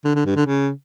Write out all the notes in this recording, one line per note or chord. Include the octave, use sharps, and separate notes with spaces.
D3
D3
G2
D3
C#3